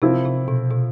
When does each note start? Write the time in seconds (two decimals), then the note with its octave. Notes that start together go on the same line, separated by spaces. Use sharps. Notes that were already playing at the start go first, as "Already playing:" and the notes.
0.02 C3 F3 C4 E4
0.25 C3
0.48 B2
0.71 B2